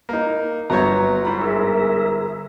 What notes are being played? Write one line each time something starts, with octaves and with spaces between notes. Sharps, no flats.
A#3 D#4
G1 F#3 B3 C#5 A#5 G6
G#2 B5
G#4 A#4 E5